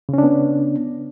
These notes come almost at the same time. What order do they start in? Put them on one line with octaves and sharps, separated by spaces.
C#3 C#4 D4 B3